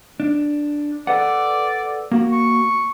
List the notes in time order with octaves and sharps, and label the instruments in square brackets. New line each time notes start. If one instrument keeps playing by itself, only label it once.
[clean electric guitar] D4
[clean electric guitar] A4 B4 F#5 [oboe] D5
[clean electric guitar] A#3 F#4
[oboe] C#6